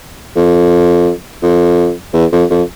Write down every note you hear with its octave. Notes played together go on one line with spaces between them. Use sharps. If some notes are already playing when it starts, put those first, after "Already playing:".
F2
F2
E2
F2
F2